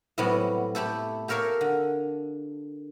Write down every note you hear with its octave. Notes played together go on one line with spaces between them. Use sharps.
A2 C3 F#3 G3 B3
A3 E4 G4 A4
G4 A4 A#4 C#5 E5 F5
D3